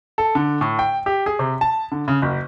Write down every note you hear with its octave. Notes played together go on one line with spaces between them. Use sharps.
A4
D3
A2
G5
G4
G#4
C3
A5
D3
C#3
F#1